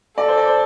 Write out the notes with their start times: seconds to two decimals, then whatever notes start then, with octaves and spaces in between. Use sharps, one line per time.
0.18 A4 D5
0.28 C5
0.37 D5
0.47 C5